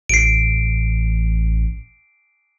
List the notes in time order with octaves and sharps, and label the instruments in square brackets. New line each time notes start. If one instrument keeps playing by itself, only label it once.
[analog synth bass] A1 [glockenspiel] C7 D7